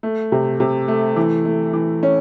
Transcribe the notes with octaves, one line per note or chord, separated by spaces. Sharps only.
A3
C3
C3
A3
E3
A3
E3
C#4